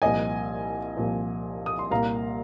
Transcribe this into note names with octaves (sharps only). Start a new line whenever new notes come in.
C2 A#2 F3 D#5 G#5
C2 A#2 F3
D#6
C6
C2 A#2 A#3 F5 A#5